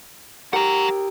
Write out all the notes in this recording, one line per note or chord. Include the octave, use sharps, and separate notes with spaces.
G4 A#4 F#5 A#5